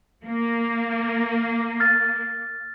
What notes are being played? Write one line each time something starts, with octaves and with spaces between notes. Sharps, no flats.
A#3
F6 A6